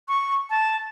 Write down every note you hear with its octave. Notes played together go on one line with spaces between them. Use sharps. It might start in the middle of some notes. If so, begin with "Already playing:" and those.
C#6
A5